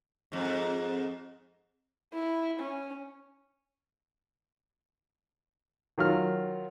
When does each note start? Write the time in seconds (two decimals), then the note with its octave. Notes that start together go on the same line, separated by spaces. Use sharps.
0.32 F2 G#2
2.13 E4
2.59 C#4
5.98 D#3 F#3 F4 F6